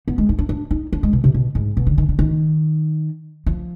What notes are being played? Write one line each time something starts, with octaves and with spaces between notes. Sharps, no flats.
B3
G#3
D#4
D4
D4
D#4
D4
G#3
B2
C3
B2
G#2
B2
D3
D#3
D3
D#3
F3